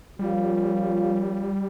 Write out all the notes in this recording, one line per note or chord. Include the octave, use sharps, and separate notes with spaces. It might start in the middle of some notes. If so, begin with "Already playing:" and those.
F3 G3 A#3 C#4 F4